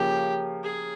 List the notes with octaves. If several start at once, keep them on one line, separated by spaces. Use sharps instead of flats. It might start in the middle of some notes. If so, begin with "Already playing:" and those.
Already playing: C#3 F3 A#3 C#4 G4
G#4